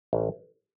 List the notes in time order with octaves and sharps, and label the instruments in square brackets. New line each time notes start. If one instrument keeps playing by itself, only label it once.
[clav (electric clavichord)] A1